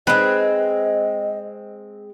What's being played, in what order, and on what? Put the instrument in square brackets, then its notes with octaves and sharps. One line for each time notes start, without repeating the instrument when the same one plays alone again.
[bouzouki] G#3 C4 [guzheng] B4 [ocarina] D#5